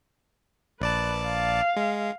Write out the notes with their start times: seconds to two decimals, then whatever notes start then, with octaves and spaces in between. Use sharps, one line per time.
0.81 A#1 B4 D5 A5
1.28 F5
1.76 G#3